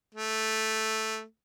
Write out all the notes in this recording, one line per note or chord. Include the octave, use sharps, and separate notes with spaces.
A3